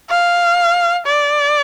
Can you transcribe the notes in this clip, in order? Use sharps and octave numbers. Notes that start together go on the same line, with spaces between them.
F5
D5